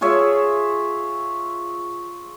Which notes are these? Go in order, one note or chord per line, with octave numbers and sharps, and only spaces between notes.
F4 G#4 C#5 E5